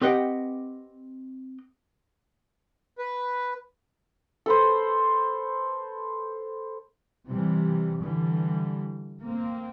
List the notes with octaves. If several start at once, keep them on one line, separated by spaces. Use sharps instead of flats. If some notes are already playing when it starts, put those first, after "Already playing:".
C4 G4 B4 D#5 F#5 G5
B4
A4 B4 C5
C3 E3 G3
D3 E3 G3
A#3 C4